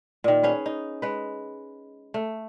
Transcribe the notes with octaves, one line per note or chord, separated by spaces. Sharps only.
A#2 D#3
C#4 G#4 B4
D#4
G#3 B4
A3